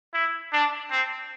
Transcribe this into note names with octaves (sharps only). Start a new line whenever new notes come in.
E4
D4
C4